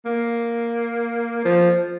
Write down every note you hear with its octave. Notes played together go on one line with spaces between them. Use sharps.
A#3
F3